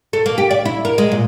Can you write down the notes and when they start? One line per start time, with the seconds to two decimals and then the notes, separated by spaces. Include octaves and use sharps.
0.13 A4
0.26 A#3
0.38 G4
0.51 D5
0.66 E4
0.85 A#4
0.98 G#3
1.12 A#2